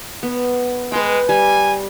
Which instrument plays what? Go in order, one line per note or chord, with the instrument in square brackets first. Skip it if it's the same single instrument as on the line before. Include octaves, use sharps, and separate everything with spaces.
[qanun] B3
[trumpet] G#3 [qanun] B4 G5
[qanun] G3 [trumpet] G#5